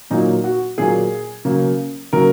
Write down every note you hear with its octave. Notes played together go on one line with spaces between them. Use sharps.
A#2 F#3 A#3 D#4
F#4
A#2 F#3 A#3 G#4
C#3 F#3 A#3
C#3 F#3 A#3 A#4